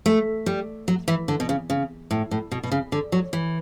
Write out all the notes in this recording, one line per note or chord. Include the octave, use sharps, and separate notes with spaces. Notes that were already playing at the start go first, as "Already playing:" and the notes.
A3
G3
F#3
E3
D3
B2
C#3
C#3
A2
A2
B2
B2
C#3
D3
F#3
E3